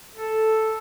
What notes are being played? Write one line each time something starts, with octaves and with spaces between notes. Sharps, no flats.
A4